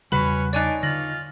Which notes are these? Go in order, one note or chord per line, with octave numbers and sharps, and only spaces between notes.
E2 C#3 G3 C#4 F#4 B4 B5
D4 D#4 C#5 D5 G#5 F#6
D3 F4 A#6 F#7